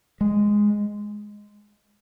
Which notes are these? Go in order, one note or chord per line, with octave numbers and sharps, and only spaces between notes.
G#3